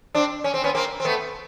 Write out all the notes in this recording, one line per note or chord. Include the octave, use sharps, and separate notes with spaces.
C4 D4
C#4
C4
B3 C#4
A#3 C4
C4
A3 B3